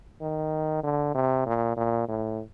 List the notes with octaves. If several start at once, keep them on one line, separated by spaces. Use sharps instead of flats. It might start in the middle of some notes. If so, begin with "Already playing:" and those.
D#3
D3
C3
A#2
A#2
A2